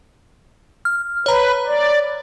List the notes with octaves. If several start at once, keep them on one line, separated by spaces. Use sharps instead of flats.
F6
B4 C#5 A#5
D5